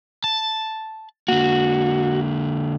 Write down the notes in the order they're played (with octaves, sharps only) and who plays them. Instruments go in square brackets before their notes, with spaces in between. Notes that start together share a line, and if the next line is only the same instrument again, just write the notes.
[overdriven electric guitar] A5
[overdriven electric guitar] D3 A#3 [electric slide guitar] F#4